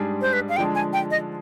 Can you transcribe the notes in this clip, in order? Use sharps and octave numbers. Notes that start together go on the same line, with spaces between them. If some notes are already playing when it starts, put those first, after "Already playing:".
Already playing: G#2 G3 D4 G#4 D5
C5
B4
F5
D3 F3 G#3 D4 G5
G#5
G5
D#5